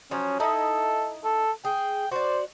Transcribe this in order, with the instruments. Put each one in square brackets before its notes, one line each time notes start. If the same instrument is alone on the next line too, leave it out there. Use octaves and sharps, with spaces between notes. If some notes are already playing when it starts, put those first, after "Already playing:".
[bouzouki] F3 F#3 [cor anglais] C#4
[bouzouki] D#4 E4 D#5 [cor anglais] A4
[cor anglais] A4
[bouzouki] G#4 [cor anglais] G5
[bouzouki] F#4 D5 [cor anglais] C5